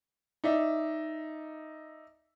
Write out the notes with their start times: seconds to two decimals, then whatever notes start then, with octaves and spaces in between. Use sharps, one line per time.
0.44 D#4 D5 E5